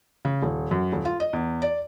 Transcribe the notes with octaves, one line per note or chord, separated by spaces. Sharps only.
C#3
D#1
F#2
D#1
F4
D#5
E2
D5